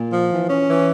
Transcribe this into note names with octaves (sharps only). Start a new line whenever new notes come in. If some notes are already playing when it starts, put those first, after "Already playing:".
Already playing: A#2
F3
E3
C#4
E3